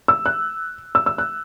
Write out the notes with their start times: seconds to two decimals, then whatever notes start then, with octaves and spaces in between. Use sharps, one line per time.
0.08 E6
0.26 F#6
0.95 E6
1.06 E6
1.18 F#6